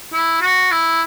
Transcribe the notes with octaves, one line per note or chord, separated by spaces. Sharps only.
E4
F#4
E4